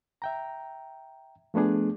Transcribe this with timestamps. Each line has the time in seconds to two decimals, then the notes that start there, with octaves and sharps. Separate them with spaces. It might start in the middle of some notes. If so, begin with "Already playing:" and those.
0.22 E5 G5 A#5
1.54 F3 A3 B3 D4 G#4